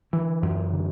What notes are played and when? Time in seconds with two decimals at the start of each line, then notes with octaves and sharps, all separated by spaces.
0.13 D3 E3
0.42 F#2
0.73 D3